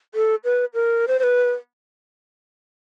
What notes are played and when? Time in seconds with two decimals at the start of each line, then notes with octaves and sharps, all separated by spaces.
0.15 A4
0.44 B4
0.74 A#4
1.08 C5
1.19 C5
1.23 B4